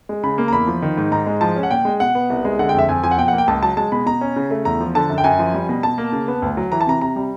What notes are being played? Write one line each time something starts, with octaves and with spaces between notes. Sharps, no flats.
G#3
C#3 B5
A#3
A#5
E2 B5
F3
D#3
G#2
G#2 A#5
G#3
F3 A5
C#4
F#5
A#2 G5
G#3
B2 F#5
B3
C2
G#3
D3 F#5
G5
F2 E5
F2 G#5
F3 G#5
F#5
B2 G5
F#5
A#3
G5
C#2 A5
F#3 A5
G#3 A5
B2 B5
B2 A#5
C#4
C#3
A3
E2 A#5
F3
D3 A5
F#2
G5
F#2 G#5
F3
G3
B2
B2 A5
A#3
C#3
B3
D2
F#3
E3 A#5
A5
C3 A#5
C3 A#5
G3